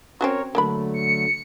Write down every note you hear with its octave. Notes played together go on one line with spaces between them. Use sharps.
C4 C#4 F#4 A#4 C#5
D3 F#3 A3 A#3 D4 B5
C#7